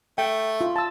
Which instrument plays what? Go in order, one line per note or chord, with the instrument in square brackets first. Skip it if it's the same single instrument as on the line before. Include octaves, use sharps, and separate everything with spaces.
[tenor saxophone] A3 [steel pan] G5
[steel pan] F4
A5 E6